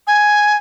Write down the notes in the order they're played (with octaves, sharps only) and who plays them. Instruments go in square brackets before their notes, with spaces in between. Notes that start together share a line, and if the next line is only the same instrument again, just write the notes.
[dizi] G#5